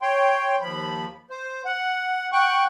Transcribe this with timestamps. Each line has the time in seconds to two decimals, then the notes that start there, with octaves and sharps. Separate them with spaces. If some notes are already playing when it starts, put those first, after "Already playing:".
0.02 C#5 G5 C6
0.61 D#2 F3 B5
1.30 C5
1.65 F#5
2.32 F#5 G5 C#6 F#6